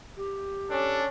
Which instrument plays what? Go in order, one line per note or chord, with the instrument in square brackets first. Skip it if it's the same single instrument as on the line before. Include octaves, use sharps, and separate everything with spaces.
[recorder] G4
[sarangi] C#4 [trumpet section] D4 A4